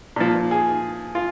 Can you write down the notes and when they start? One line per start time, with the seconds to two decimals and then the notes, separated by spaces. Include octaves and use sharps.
0.16 A#2 F3
0.51 G#4
1.15 F4